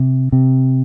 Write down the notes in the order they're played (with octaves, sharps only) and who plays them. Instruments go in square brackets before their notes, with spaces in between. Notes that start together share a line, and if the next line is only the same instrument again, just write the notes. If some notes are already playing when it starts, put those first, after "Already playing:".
Already playing: [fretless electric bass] C3
C3